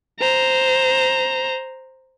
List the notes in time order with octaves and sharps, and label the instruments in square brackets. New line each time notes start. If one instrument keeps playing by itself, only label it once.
[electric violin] C5 A#5